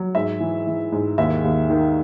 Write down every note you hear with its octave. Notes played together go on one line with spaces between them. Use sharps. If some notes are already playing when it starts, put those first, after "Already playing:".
Already playing: F#3
G#2 E5
E3
E3
G#2
D#2 E5
D#2
D#3